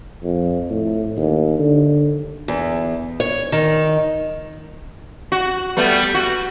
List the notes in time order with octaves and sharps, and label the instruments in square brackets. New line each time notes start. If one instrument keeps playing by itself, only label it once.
[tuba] F2
A2
D#2
D3
[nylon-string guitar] E2
C#5
D#3
[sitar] F#4
G3 A3 B3
F#4